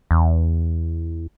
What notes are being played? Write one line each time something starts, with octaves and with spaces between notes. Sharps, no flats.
E2